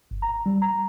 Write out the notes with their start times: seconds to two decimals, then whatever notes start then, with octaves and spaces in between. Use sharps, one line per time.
0.11 G1
0.22 A#5
0.46 G3
0.62 A#5